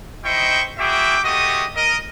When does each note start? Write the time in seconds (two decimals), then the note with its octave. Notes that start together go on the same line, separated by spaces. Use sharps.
0.25 D#4 E4 C5 D#5 G5 C#6
0.79 E4 F#4 G#4 E5 G5 D6
1.24 G#3 A3 F#4 G4 D#5 D#6
1.76 A#4 D#5